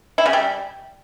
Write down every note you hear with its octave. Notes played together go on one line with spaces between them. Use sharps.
E4
C#3
G3